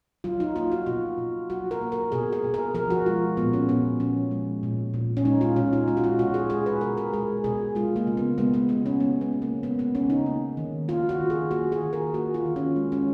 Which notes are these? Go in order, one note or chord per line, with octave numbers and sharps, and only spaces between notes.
F#3 F4
D#4
A#3 F4
F#4
B2 F4
B2
F#3 F#4
A#4
A#3
A#4
B2 G#4
G#4
B2
A#4
F3 A#4
F#4
G#3 F4
A#2 B3
C#4
A#2 B3
F3 C#4
G#3
A#2
A#2
C#4
G#3 D#4
F4
B2 C#4
D#4
G#3 F4
F#4
F4
B2 F#4
G#4
G#3 G#4
B4
B2 A#4
A#4
G#3 G#4
B2 G#4
G#3 F4
A#3
C#3
B3
G#3 B3
B3
C#3 B3
C#4
G#3 B3
B3
C#3
A#3
G#3 B3
B3
C#3 C#4
D#4
A#3
D#3
A#3 F4
F#4
D#3
G#4
A#3 F#4
G#4
D#3
A#4
A#3 F#4
F4
D#3
C#4
G#3
C#4